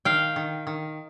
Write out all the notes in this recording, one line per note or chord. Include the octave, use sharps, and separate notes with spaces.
D#3 F5 G5
D#3
D#3